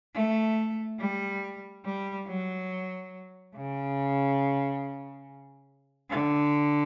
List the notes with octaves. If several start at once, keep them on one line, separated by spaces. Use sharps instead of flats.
A3
G3
G3
F#3
C#3
D3